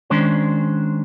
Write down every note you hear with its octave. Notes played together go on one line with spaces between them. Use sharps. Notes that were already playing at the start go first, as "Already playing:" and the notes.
D#3 G#3 C#4 D4 C5